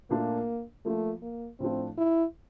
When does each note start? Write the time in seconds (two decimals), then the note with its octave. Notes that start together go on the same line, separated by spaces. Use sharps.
0.10 A#2 A3 A#3 D4 F4
0.85 F3 A3 A#3 F4
1.22 A#3
1.60 A2 F3 A3 C4 D4 F4
1.98 E4